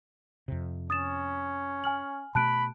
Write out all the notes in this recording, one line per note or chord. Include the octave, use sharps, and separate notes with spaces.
F2 C3
C#4 D#6 A6 E7
G#5 F6 F#7
B2 A3 A5 B5 F#6 D7